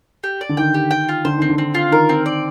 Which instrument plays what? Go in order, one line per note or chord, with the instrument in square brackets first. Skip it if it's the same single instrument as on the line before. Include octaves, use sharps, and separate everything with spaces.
[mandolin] G4
D5
[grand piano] D3
[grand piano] D#3 [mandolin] G5
[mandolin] G4
G5
F4
[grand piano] D3 [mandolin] C5
[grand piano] D#3 [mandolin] C4
[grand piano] D3
[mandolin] C4
F4
[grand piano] D#3 [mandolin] A#4
[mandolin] C4
D5